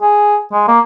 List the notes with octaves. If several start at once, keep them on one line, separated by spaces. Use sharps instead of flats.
G#4
G#3
A#3